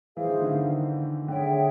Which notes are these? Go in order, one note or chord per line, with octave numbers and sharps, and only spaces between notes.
E3 F4 G#4 C5 F5
D#3
D3
D#3
D3 G#4 C#5 E5 G5